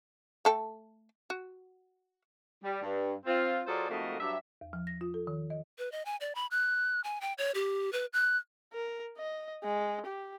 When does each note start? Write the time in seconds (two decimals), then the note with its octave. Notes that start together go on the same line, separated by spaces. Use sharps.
0.45 A3 A4 G5
1.30 F#4
2.63 G3
2.82 G2
3.26 C4 F4
3.67 F#3 F4 G#4 A4 C5 D5
3.89 F2 G#2 A3 A#3 F#4 D#5
4.20 G2 F#3 G4 E5
4.61 E2
4.73 F3
4.87 A#6
5.01 F4
5.14 A4
5.27 D#3
5.50 D#5
5.78 B4
5.92 D#5
6.05 G#5
6.21 D5
6.35 B5
6.51 F#6
7.04 G#5
7.21 G5
7.38 C#5
7.55 G4
7.93 B4
8.13 F#6
8.73 A#4
9.18 D#5
9.63 G#3
10.06 G4